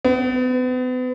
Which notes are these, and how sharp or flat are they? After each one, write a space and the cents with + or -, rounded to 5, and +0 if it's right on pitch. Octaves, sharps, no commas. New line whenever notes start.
B3 +40